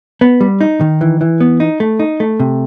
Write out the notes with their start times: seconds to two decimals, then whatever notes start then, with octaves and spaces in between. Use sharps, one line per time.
0.21 B3
0.40 G3
0.61 D#4
0.81 D#3
1.01 E3
1.21 E3
1.41 B3
1.60 D#4
1.80 A3
2.00 D#4
2.20 A3
2.40 C3